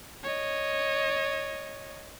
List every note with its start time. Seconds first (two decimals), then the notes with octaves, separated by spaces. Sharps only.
0.23 C#5 D#5